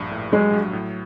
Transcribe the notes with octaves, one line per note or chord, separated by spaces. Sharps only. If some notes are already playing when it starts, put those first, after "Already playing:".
Already playing: A#1 G2
A2
F#3 G#3
F#3
A2